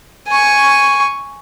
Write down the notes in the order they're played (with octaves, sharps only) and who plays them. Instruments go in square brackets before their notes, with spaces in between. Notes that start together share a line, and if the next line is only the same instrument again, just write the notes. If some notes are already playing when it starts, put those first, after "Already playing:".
[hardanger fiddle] G#5 C#6